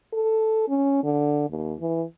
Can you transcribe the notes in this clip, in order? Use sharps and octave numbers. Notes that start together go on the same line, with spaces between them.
A4
C#4
D3
D#2
E3